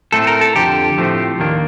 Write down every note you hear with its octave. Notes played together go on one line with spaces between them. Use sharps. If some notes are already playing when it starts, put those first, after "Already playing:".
A2 A3 C4 A4
A#4
A4
F2 D3 F3 G4
A2 F3 A3 C4
D#2 D#3 A#3 D4